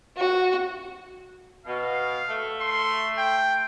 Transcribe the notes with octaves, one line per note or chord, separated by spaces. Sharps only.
F#4
B2 F5
A3
C6
G5